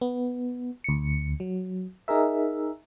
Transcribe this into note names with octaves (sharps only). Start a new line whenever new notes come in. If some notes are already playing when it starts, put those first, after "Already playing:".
B3
D2 C#7
F#3
D#4 G#4 A#4 E5